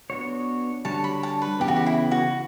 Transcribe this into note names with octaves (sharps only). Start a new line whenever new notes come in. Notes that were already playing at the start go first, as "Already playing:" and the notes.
B3 D4 F#4 C#5
D3 G3 D4 F#4 C#5 A5
B5
A5
B4
C#3 E3 B3 G4
F#4
G4
E4
F#4